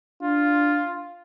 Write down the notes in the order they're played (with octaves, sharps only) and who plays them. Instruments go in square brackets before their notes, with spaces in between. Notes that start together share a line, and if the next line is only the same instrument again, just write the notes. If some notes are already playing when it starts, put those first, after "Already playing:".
[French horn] D4 [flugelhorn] F4